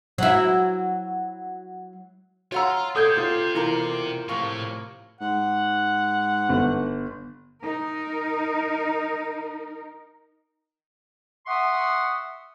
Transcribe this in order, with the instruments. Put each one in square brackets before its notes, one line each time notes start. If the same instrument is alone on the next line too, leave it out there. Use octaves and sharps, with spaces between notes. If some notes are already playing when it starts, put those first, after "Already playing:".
[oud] F#3 E4
[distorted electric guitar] F4 [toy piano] F#4 F5 E6 [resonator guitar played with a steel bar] C#5 F#5 A#5
[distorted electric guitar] C4 G4 [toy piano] A4 [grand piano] D#6 G6 G#6
[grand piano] F4
[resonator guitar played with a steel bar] E2 A#3 A#4 [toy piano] E4
[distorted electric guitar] A2 [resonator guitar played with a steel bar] C3 F3 A#3 [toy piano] C#6
[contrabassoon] G#2 [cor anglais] F#5
[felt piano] G1
[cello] D#4 A#4
[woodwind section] E5 F#5 C6 C#6 D#6